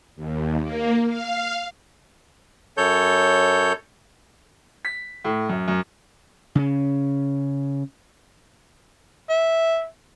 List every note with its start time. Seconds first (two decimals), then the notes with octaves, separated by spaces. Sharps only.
0.16 D#2
0.62 A#3
1.07 F5
2.77 F#2 A4 C#5 G6
4.85 B6
5.25 A2
5.49 F#2
5.68 F#2
6.55 C#3 C#4
9.29 E5